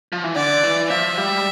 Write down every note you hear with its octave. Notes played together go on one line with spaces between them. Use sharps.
F3
E3
D3 D5
E3
F3 E5
G3